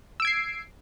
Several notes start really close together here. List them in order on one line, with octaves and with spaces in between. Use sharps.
E6 D7 G#6 C7